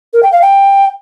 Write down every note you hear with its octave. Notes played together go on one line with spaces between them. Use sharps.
A#4
G5
F5
G5